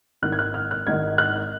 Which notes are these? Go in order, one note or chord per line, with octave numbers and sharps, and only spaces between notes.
G#1 G#2 D#3 F#6
G#6
F#6
F6
F#6
G#1 G#2 D#3 G#6
F#6